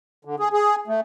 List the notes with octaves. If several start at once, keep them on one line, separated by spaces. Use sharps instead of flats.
D3
G#4
G#4
A3